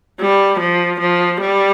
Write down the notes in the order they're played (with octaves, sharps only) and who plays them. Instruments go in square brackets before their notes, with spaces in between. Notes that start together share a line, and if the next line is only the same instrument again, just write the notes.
[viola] G3
F3
F3
G3